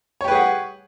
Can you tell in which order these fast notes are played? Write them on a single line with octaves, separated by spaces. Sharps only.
C#5 G4 B4 G#4 F#5